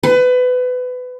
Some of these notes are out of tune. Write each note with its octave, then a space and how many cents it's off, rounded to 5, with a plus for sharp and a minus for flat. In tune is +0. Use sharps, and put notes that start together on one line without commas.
B4 +25